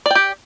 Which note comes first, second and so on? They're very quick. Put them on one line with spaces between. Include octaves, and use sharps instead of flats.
D5 G5 G4